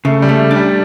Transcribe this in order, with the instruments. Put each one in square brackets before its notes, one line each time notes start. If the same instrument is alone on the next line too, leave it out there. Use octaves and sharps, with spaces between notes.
[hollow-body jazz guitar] C#3 [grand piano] A3
[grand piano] G3
[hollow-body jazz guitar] A3
D4
[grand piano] G3